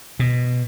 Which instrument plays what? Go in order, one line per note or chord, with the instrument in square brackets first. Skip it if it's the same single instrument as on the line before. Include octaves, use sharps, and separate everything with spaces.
[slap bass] B2